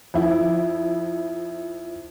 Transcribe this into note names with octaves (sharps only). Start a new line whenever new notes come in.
F2 E4